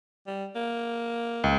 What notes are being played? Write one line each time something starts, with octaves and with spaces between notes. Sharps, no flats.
G3
A#3
C#2